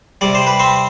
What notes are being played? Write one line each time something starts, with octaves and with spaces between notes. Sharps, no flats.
C3 G3 D5
C5
B4
C4 C5